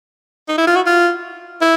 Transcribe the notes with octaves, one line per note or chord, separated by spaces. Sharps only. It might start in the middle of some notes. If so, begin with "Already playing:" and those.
D#4
E4
F4
F#4
F4
E4